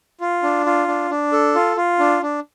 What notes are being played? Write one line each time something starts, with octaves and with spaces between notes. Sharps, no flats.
F4
D4
F4
D4
D4
A4
F4
F4
D4
D4